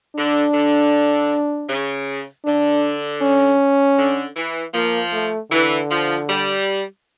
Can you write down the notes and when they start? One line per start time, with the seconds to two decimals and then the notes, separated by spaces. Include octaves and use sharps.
0.16 D3 D4
0.54 D3
1.68 C#3
2.45 D3 D4
3.22 C#4
3.99 D3
4.36 E3
4.74 F3 A#3
5.12 A3
5.51 D3 E3
5.90 F3
6.28 G3